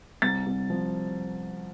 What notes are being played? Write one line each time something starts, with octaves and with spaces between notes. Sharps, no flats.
C2 A6
C2
F3